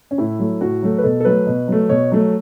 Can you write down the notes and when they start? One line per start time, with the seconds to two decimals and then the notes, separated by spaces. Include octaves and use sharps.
0.11 C#4
0.18 A2 E4
0.39 F#3 A3
0.61 A2 F#4
0.83 F#3 A3
0.98 B4
1.04 B2 A4
1.20 A4
1.25 F#3 A3 B4
1.47 B2
1.68 F#3 A3
1.89 B2 C#5
2.12 F#3 A3